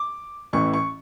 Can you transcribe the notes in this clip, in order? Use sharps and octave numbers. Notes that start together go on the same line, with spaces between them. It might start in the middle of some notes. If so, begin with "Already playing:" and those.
Already playing: D6
A1 A2 E3 C#6
C#6